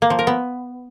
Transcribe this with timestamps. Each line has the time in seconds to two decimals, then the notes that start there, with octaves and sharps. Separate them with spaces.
0.02 A#3
0.10 F3
0.19 A#4
0.27 B3